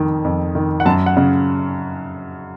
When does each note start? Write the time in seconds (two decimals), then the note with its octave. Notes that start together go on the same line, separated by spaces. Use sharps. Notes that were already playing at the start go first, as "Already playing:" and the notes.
Already playing: F2 D#3
0.25 F2
0.55 D#3
0.80 F#5
0.86 F#2 A5
1.06 F#5
1.17 C#3